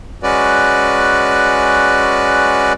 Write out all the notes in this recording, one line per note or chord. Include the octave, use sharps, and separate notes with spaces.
G#3 C#4 F#4 B4 D5